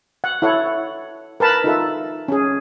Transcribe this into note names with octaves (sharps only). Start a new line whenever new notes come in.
F#5
E4 A4 C#5 F#5
A#4 B4 A5 B5
D#4 F4 A4 E5
C#4 G#4